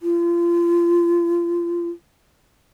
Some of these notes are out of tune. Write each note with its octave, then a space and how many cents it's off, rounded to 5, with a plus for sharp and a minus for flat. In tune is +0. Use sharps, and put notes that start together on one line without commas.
F4 -30